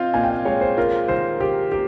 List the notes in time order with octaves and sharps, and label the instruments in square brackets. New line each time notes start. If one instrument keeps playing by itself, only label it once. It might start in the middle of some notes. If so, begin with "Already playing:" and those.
Already playing: [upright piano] C4 F4 [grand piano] D#5 F5
[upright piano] A#2 [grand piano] G#5
[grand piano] G5
F5
[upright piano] G#3 [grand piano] C#5
[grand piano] C5
[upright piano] F4 [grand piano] A#4
[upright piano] D#3 [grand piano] C5
[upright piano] D#3 [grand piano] G4
[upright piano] A#3 [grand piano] G4